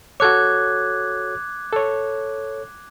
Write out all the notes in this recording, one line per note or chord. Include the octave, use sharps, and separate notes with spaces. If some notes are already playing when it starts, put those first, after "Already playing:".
F#4 A4 C#5 D6 F#6 G#6
A4 C#5